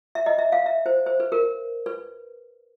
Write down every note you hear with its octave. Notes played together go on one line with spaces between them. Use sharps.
E5
D#5
E5
F5
E5
C5
C5
B4
A#4
B4